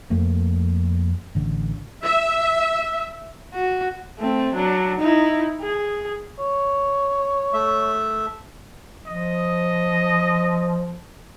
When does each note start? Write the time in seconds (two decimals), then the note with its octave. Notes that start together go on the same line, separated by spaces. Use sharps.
0.10 F2 F3 A3 A#3
1.35 A1 D3
2.04 E5
3.54 F#4
4.18 A3 C4
4.54 F#3 D4
4.99 D#4 E4
5.60 G#4
6.39 C#5
7.53 A3 E5
9.07 F3 D#5